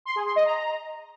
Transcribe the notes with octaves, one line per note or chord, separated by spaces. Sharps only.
C6
G#4
C6
D#5
A#5